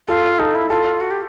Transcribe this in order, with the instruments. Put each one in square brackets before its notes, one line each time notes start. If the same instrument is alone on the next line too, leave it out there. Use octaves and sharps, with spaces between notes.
[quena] F4 [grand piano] A4
[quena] D#4 [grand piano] A4
[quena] E4
[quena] F4 [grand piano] A4
[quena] F#4
G4